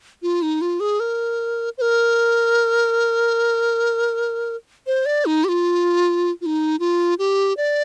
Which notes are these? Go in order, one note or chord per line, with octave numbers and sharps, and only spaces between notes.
F4
D#4
F4
G#4
A#4
C5
A#4
C5
D5
D#4
G4
F4
F4
D#4
F4
G4
D5